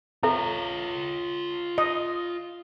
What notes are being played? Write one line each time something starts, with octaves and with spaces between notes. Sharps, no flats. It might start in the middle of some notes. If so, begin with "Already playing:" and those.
F4 A4 C#5 E5 A#5
D#5